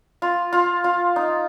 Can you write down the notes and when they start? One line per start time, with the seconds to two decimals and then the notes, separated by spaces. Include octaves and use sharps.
0.22 F4
0.53 F4
0.84 F4
1.16 D#4